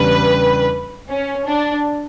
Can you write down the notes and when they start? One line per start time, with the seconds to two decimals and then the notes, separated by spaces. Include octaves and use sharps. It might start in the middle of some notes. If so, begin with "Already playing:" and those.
Already playing: E2 C#3 G3 D4 B4
1.08 C#4
1.46 D4